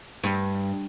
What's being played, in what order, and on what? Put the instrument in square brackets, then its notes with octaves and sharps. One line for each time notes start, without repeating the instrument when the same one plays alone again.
[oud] G2